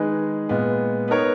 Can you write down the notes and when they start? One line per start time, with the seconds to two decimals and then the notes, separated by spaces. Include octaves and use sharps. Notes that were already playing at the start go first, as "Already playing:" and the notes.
Already playing: D#3 G#3 D#4 G#4 B4
0.49 A#2 G#3 B3
1.08 B3 D#4 A#4 C#5